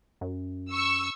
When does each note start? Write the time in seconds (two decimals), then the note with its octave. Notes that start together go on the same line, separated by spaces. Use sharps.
0.21 F#2
0.72 C#6 E6